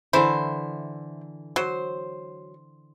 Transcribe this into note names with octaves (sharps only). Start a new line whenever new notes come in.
D3 E3 E4 C5
F#3 C5